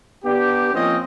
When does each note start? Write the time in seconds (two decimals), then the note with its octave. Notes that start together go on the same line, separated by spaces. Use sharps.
0.24 B3 D4 G4
0.73 F3 A#3 C4 C#4 D#5